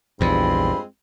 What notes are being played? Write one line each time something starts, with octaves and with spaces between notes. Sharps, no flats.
A#1 E2 G2 G#3 C4 F4 B5